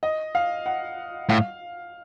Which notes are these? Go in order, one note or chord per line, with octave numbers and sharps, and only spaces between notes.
D#5
F5
F#5
A2 F5